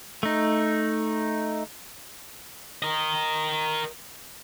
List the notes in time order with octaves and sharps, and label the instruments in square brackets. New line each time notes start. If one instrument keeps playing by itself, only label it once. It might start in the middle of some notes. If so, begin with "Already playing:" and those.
[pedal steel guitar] A3 D#4
[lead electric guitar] A#4 D#5